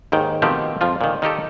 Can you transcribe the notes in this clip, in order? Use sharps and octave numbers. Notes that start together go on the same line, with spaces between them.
D#2 G#2 D#3 G5
B2 D#3 F3 A3 C4 G4
F2 F3 F4
A#2 D#3
D#3 D#4 G4 A4